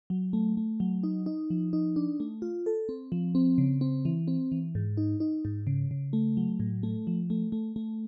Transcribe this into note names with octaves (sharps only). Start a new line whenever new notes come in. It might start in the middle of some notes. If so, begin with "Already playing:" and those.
F#3
A3
A3
F#3
D#4
D#4
F3
D#4
D4
A3
F4
A4
C4
F3
C4
C#3
C4
E3
C4
E3
G#2
D#4
D#4
G#2
C#3
C#3
A3
F#3
A2
A3
F3
A3
A3
A3